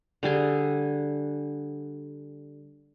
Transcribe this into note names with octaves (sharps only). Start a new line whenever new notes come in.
D3 G3 G#4 G#5